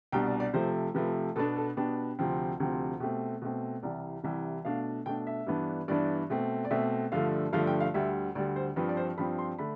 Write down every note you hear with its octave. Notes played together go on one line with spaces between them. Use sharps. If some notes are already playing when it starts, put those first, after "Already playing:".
C2 B2 G3 D4 G5
D5
D5
C3 F3 A3 C5
C3 F3 A3 B4
B2 B3 D4 A4
A4
B2 B3 D4 G4
D2 C3 F3 C4
D2 C3 F3 C4
B2 A3 C4 G4
B2 A3 C4
C2 C3 E3 G3 D5
C2 C3 E3 G3 E5
B2 A3 D4 F5
B2 A3 D4 G5
E5
G2 E3 B3 D4
G2 E3 B3 D4 D5
B2 A3 C4
D5
B2 A3 C4 E5
G2 D3 F3 A3 F5
G2 D3 F3 A3 F5
G5
F5
D2 D3 G3 E5
D2 D3 G3 D5
C5
G2 F3 C4 B4
D5
C5
G2 F3 C4 B5
C6
D3 A3 D4 B5